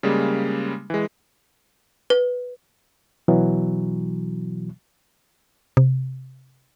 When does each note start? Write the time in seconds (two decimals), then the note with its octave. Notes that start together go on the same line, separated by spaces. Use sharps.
0.03 C#3 G3 G#3 A#3
0.90 E3 G#3
2.10 B4
3.28 B2 E3 F#3
5.77 C3